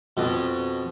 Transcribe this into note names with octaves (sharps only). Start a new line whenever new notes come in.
F2 B2